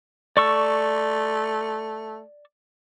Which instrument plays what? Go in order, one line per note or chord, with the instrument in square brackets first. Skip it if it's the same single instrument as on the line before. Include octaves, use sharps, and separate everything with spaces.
[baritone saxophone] A3 [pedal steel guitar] D5 C#6 E6